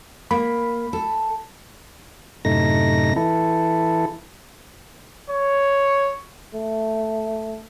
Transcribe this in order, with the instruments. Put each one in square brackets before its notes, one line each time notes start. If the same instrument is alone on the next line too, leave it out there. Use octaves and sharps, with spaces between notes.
[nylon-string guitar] A#3 [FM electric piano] B5
[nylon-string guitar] A4
[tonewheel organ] F#2 A2 C3 A3 D#4 A#6
E3 E4 A4
[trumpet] C#5
[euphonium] A3